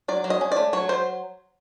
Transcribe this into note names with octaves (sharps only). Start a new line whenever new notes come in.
F#3 D5
F#3
D#5
C#4
A3 D5
F#3 C#5
F#3 C5